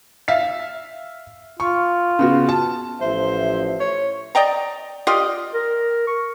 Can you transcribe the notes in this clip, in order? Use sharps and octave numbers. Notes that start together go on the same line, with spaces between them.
E5 F5 B6
F4 C#6
C#3 B3 F#4
A5
A1 F3 C5 E5
C#5
D5 D#5 G5 A#5
F4 G4 D5 D#5
A#4
C#6